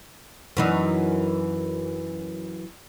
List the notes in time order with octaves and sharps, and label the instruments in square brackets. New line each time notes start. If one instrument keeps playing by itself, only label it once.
[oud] F#2 E3 D#4